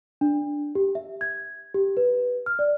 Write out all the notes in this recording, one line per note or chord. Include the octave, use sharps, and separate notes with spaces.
D4
G4
E5
G#6
G4
B4
F6
D5